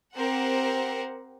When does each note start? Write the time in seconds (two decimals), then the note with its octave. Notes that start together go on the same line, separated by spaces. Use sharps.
0.16 C4 G4 A#4 C5 F#5